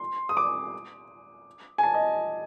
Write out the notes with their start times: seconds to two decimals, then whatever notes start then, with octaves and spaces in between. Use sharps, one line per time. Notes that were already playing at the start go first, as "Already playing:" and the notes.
Already playing: C6
0.29 D#6
0.37 D6
1.78 G#5
1.83 A5
1.94 D#5